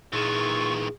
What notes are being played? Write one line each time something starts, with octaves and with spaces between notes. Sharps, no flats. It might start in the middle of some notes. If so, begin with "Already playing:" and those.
A#2 D#3 E3 F4 G#4 C#6